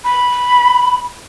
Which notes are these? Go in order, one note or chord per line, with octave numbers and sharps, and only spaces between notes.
B5